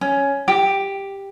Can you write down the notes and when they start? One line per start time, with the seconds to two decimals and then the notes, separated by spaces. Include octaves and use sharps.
0.01 C#4
0.48 G4